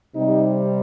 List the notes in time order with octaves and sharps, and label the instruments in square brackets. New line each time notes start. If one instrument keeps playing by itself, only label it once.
[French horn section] C3 G3 C4 D#4